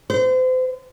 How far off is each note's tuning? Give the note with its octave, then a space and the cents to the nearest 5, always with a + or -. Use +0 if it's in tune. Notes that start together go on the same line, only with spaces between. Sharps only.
C5 -35